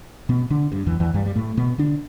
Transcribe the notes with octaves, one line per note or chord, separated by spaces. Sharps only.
B2 B3
D3 D4
G2 G3
E2 E3
E2 E3
G2 G3
G3
A2 A3
B2 B3
D3 D4